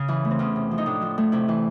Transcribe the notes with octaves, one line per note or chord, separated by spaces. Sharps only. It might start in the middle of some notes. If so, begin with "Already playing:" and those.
Already playing: C#3 C#4
E3
A3
C4
E2 C#4
C3
F3
D#4
A2 D4
F3
A3
C3 E4
E3